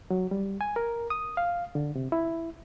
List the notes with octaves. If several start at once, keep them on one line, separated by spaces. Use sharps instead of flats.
F#3
G3
G#5
A#4
D#6
F5
D3
C3
E4